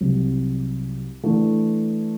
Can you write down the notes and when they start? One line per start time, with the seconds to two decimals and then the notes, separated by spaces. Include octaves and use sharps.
0.01 C2 C3 F#3
1.23 E3 A3 D4